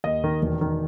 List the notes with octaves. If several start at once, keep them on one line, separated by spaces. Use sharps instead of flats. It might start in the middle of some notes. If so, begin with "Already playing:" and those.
D#2 D#5
D#3
E1
D#3